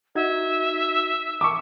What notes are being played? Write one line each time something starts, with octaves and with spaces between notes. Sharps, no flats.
D#4 F#4 E5 G#6
C#6 D6